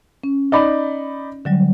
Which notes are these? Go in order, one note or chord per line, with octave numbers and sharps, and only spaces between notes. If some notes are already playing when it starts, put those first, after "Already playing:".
C#4
D#4 D5 B5
D3 F#3 G3